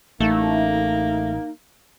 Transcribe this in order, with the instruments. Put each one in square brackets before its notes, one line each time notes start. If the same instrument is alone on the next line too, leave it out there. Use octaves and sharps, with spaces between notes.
[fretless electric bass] A1 [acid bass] A3 [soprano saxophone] A#3 [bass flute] D#4